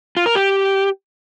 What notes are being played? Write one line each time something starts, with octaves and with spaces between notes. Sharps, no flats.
F4
A#4
G4